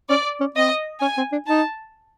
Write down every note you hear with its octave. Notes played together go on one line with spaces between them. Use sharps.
C#4 D5
C#4
C4 D#5
C#4 G#5
C4
D4
D#4 A5